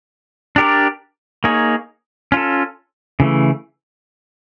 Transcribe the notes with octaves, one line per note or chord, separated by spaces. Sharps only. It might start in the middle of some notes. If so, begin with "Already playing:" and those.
D4 G4 A#4 D5
A#3 D#4 G#4 C#5
C#4 F4 A4
C#3 E3 A3